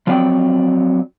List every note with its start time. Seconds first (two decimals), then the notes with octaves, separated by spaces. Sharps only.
0.07 F3 F#3 C4 D5 F#5 G5